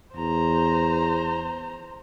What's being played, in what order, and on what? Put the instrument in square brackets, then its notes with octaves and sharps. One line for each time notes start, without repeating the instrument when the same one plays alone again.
[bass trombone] E2 [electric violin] C5 A#5